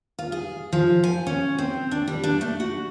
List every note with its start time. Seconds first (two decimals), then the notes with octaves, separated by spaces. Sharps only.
0.19 F4
0.32 G#4
0.73 F3
1.04 G#5
1.27 C#4
1.58 C4
1.91 D4
2.08 G3
2.24 D4
2.41 A3
2.60 F#4